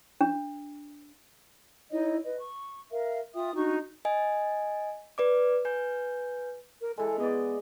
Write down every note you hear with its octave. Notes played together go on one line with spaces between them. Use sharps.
D4
D#4 E4 C#5 D#5
B4 D#5
C#6
A#4 E5 F5
F4 E5 G5 D#6
D4 D#4 F#4 C#6
D#5 G#5
B4 D5 D6
B4 G#5 G6
A#4
E3 G#3 A4
B3 D5 D#5